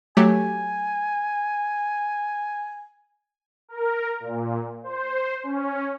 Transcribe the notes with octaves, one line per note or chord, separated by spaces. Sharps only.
F#3 A3 G4 G#5
A#4
A#2
C5
C#4